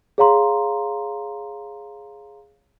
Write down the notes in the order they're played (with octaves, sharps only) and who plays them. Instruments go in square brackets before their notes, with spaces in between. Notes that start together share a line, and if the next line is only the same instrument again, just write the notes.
[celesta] G#4 C#5 F5 A#5 C6